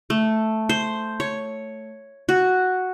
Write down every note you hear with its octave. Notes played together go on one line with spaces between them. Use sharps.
A3
C5
C#5
F#4